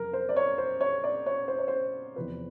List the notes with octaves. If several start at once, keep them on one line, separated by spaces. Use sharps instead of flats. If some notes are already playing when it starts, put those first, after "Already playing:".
Already playing: F2 C3 F#3 A#4
C5
D5
C#5
C5
C#5
D5
C#5
C5
C#5
C5
E2 C3 F3 B4